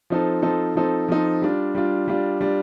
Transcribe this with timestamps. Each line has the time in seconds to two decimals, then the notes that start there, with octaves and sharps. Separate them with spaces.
0.10 F3 C4 D#4 A4
0.42 F3 C4 D#4 A4
0.75 F3 C4 D#4 A4
1.08 F3 C4 D#4 A4
1.42 G3 D4 F4
1.75 G3 D4 F4
2.08 G3 D4 F4
2.41 G3 D4 F4